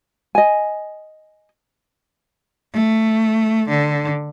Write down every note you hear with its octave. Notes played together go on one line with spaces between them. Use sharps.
D#5 G#5
A3
D3